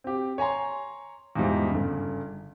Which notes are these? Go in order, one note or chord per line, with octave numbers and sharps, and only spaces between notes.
C4 G4
C#5 G#5 A#5 C6
E2 G#2 F3 G3 G#3
G1 C#3